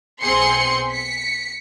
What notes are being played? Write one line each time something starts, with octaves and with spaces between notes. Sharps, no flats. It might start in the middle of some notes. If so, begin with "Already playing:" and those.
B1 C4 G#4 C6 C#7
B6 C#7